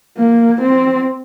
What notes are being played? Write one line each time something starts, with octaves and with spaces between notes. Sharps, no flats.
A#3
C4